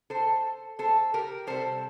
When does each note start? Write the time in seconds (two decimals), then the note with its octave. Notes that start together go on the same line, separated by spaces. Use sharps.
0.10 A4 C5
0.79 A4 C5
1.14 G4 A#4
1.47 C3 G3 A4 C5